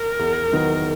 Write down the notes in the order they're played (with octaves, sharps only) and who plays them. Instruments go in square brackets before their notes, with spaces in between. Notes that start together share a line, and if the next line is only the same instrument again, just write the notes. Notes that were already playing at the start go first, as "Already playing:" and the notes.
Already playing: [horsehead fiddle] A#4
[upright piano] E2
D#3 F#3 B3